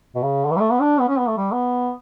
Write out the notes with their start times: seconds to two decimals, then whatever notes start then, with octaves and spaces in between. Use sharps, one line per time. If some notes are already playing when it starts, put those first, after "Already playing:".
0.15 B2
0.23 C#3
0.45 D3
0.51 E3
0.57 G3
0.61 A3
0.71 B3
0.80 D4
1.00 B3
1.08 C#4
1.19 B3
1.27 A3
1.37 G3
1.52 B3